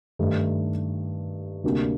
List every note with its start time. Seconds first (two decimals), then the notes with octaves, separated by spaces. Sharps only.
0.19 G2 D#3 A3 D#4 G4
1.63 D2 C3 G3 A#3 D4